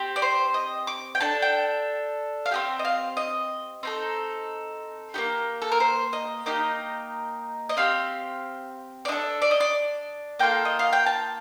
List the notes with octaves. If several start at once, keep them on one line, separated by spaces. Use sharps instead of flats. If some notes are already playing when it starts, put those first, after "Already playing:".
Already playing: C4 G4
D5
C5
D#5
D6
G5
D4 A4 A5
G5
F5
C4 D#4 G4 G5
D#5
F5
D#5
C4 D#4 A4
A#3 D#4 G4
A4
A#4
C5
D#5
A#3 D#4 G4 D#5
D#5
C4 G4 F5
D5
D4 A4 D#5
D5
D#5
D5
A#3 F4 A4 G5
D#5
F5
G5
A5